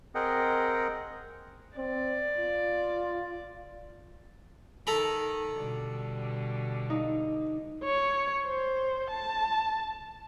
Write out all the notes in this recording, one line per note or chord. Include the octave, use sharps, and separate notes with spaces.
C4 G#4 A#4 D#5 F#5 G5
C4 D5
F4
D#3 A4 A#5 B5
B2 D3 G3
D#4
C#5
C5
A5